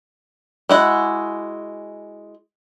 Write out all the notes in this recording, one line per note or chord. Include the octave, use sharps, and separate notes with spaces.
G#3 E4 F#4